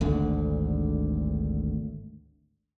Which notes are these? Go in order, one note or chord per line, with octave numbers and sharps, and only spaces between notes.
G#1 D2 D3